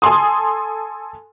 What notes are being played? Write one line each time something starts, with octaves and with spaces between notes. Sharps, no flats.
A4 G#5 C6 D#6